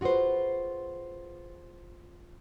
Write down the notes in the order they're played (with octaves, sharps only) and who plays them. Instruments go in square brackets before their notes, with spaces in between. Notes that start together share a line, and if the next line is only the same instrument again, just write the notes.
[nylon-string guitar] F4 F#4 G#4 B4 C5